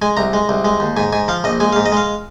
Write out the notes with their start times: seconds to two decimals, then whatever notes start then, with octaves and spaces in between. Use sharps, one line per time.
0.02 G#3 G#5
0.17 C2 A#5
0.33 G#3
0.49 C2
0.65 G#3
0.80 D#2
0.97 G#2 G#5
1.13 G#2 G#5
1.28 F3 F5
1.44 A#1 D#5
1.60 G#3 G#5
1.73 G#2 F5
1.86 D#5
1.92 G#3 F5